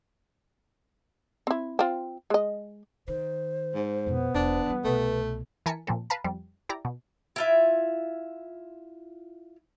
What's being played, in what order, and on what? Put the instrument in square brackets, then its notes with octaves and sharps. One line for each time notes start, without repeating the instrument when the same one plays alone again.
[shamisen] C4 E4
C4 F4
G#3 D#5
[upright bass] D#3 [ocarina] C5
[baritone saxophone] G#2
[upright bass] F2 B2 [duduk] B3
[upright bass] E1 [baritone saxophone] D4
[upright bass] E3 G3
[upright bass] C2 B2 [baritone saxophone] A3 [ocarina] B4
[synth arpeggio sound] E3 A#4 G#5 A5 B6 C#7
A#2 F3 C4 A4
B4 F5 A5 A#5
F2 F3 G3
E4 G4 D5 A#5
B2
[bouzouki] E4 F4 E5